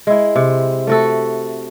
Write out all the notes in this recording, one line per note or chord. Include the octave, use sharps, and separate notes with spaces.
G#3 E4
C3
A3 F#4 A4